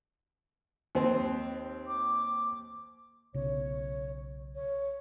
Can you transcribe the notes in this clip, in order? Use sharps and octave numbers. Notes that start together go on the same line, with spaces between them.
D#2 C4
D6
B1 C#3 C#5
C#5